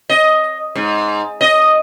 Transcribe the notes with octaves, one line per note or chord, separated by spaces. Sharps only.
D#5
G#2
D#5